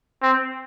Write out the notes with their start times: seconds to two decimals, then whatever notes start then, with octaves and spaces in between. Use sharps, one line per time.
0.23 C4